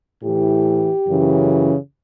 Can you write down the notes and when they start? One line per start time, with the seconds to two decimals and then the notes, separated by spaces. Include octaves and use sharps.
0.22 A2 E3 G4
1.06 F#2 C#3 E3